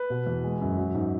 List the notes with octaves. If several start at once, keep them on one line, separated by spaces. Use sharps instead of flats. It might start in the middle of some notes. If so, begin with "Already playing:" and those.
Already playing: B4
B2
E2
G#3
F#2
F#3
G#2